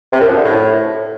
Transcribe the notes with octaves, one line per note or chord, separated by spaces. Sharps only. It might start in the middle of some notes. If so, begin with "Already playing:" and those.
C3
F#2
F3
D3
A2